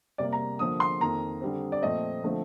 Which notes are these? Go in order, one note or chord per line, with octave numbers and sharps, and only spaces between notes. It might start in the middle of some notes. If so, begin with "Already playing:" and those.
C3 G3 A#3 D5
A#5
D3 F3 A#3 D#6
C6
F2 D#3 A#3 A#5
D3 G3 C4
D5
A#2 F3 A3 C4 D#5
D3 F3 A3 C4